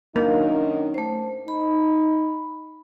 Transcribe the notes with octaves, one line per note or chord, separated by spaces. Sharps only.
F#2 D#3 A#3 D4 D#4
A3 C5
D#4 B5